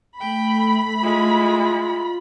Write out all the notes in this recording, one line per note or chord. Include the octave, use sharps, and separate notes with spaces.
A3 G5 B5
G#3 E4 F4